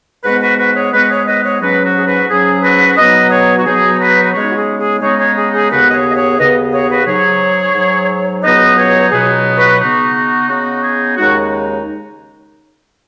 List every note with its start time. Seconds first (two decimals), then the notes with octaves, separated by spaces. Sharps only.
0.24 G#2 G#3 B3 F#4 B4
0.42 F#4 B4
0.59 F#4 B4
0.75 G#4 C#5
0.93 G#2 G#3 B3 F#4 B4
1.09 G#4 C#5
1.27 B4 D#5
1.44 G#4 C#5
1.61 G#2 F#3 C#4 F#4 B4
1.85 F#4
1.96 G#4
2.07 F#4 B4
2.29 G#2 F#3 C#4 G#4
2.63 F#4 B4
2.97 B2 F#3 B3 D#4 B4 D#5
3.31 G#4 C#5
3.59 F#4
3.66 B2 F#3 B3 D#4 G#4
3.94 C#5
4.00 F#4 B4
4.25 B4
4.34 C#3 G#3 B3 D#4 G#4 C#5
4.51 F#4
4.57 G#4
4.80 G#4
5.02 C#3 G#3 B3 D#4 G#4 C#5
5.19 G#4 C#5
5.37 G#4
5.54 G#4
5.71 D#2 C#3 B3 F#4 B4
5.89 D#5
5.93 G#4 C#5
6.10 D#5
6.17 G#4 C#5
6.39 D#2 C#3 B3 B4 D#5
6.73 G#4 C#5
6.91 F#4 B4
7.07 G#2 F#3 D#4 G#4 C#5
7.75 G#2 F#3 D#4
8.43 C#2 B2 F#3 B3 D#4 B4 D#5
8.78 G#4 C#5
9.12 C#2 B2 F#3 B3 D#4 G#4
9.57 F#4 B4
9.80 C#3 B3 D#4 F#4
10.15 F#4
10.49 C#3 B3 D#4 F#4
10.83 G#4
11.17 D#2 C#3 G#3 D#4 F#4